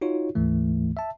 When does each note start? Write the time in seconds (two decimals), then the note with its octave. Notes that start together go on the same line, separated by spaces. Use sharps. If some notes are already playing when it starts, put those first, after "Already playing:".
0.01 D#4 F4 F#4 C#5
0.35 D2 G#2 E3 A3
0.97 E5 A5